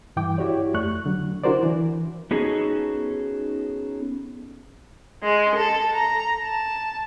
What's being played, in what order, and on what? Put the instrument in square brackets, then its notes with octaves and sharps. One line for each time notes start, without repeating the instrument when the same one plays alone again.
[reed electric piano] G2 E3 G5 D6
E4 F#4 G4 C#5 D5
F2 A3 C#6 F#6
D3 F#3
D4 E4 F#4 A#4 C5 D5
E3
[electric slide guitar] B3 C#4 D#4 F#4 G#4 A4
[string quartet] G#3
A4
A#5
A5